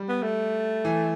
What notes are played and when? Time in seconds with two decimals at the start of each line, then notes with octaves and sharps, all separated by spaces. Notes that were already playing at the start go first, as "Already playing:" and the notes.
Already playing: G3
0.09 B3
0.23 A3
0.85 E3